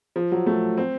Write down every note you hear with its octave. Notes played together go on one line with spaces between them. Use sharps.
F3
F#3
A3
C4